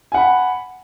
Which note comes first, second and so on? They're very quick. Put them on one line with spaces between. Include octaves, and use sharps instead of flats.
G#5 F#5 B5